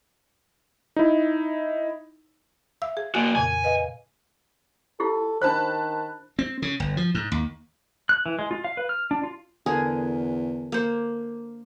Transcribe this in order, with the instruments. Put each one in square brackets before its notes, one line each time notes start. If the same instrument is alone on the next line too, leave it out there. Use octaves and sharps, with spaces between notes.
[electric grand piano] D#4 E4
[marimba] E5 F5 E6
G#4
[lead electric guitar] A#3 F#4 [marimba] G#5
[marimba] F2 A#2 C#3 [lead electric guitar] G#5
[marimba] B4 D#5 F5
[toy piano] E4 F4 G4 [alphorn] A4
[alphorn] D#3 [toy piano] D4 C5 [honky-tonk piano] A5 B5 F#6
[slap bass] C4
C#3
G1
F3
G#2
D#2
[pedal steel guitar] F#6
E3
G#3
F4
F5
B4
F6
D4
F4
[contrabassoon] E2 [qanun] D3 G#4 A#4
[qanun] A#3 C5